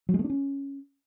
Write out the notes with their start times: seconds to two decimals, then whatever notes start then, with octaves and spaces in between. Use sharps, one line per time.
0.09 F#3
0.14 G#3
0.19 A3
0.24 D4
0.30 C#4